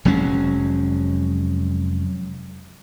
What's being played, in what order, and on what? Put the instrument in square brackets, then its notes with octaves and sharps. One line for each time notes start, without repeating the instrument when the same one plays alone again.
[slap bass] F1 F#3 G#3 C#4